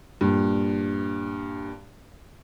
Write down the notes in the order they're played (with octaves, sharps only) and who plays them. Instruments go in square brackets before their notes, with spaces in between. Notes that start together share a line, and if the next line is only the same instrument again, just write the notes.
[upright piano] G2 A#2